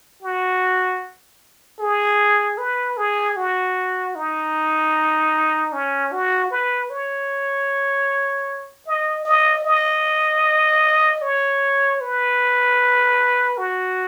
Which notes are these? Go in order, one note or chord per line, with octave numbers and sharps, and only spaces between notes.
F#4
G#4
B4
G#4
F#4
D#4
C#4
F#4
B4
C#5
D#5
D#5
D#5
C#5
B4
F#4